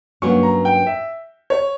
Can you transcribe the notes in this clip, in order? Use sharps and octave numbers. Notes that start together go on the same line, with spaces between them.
G2 F#3 A#3 C#4 C#6
A#5
G5
E5
C#5